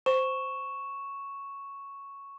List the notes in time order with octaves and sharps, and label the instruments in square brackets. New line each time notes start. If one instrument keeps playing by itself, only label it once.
[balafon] C5 [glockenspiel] C#6 E7